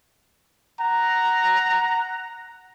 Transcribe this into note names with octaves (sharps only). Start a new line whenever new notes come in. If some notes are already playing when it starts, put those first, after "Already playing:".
F#5 A#5